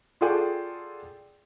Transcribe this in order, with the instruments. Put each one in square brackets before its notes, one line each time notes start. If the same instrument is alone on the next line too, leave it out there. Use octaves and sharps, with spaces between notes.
[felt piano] F4 F#4 G#4 A4 D5 G5